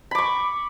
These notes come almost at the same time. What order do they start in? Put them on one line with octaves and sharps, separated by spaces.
B5 D6 C#6